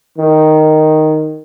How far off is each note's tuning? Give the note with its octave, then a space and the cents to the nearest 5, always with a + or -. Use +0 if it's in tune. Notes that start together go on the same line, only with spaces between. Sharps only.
D#3 -5